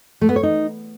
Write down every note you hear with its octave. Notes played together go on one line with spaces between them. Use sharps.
A3
B3
C#5
D#4